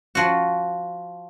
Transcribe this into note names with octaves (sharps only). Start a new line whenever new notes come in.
F3 F#4